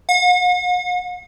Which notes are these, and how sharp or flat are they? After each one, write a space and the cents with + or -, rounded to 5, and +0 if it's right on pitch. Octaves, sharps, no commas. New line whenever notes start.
F#5 -45